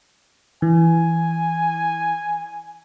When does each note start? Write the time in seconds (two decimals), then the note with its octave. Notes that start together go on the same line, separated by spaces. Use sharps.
0.62 E3 G#5